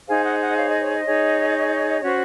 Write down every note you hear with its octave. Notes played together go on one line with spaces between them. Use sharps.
D#4 G#4 C5 F5 G#5
D#5 F#5
D#5 F#5
C#5 F5
D#5
C#5
D#5
D#4 G#4 C#5
C#4 F#4 C5 C#5